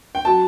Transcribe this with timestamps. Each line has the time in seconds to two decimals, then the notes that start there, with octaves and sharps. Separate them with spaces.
0.15 G5
0.25 F#3 A5